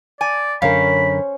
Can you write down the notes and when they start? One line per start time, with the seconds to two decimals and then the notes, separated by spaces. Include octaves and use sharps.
0.21 D5 G#5
0.62 F#2 D3 C#4 A#4 C5 C#5 F5 B5